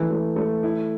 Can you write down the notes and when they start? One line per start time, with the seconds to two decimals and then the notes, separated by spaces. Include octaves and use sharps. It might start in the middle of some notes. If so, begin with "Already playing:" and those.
Already playing: E3 A3
0.10 A3
0.36 A3
0.63 E4